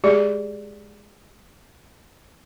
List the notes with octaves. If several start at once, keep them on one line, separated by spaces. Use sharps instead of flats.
G#3 G4 G#4 D5